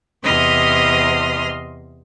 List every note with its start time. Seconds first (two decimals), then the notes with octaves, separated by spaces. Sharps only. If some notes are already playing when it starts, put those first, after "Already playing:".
0.24 E2 C3 D#5 C6 D#6 F6